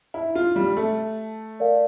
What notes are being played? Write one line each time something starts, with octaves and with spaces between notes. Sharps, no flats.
E4
F4
G3
A3
A#4 D5 F5